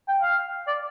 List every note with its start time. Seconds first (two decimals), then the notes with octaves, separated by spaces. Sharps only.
0.08 G5
0.22 F5
0.68 D5